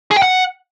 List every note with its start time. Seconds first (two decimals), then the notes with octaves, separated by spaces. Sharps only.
0.11 G#4
0.17 G5
0.22 F#5